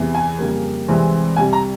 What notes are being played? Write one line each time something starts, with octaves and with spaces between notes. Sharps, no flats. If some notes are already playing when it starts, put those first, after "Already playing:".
Already playing: E2 C3 E3
G#5
F2 C#3 G3 A#3
C2 C3 E3 G#3 C4
C2 C3 G3 G#5
A#5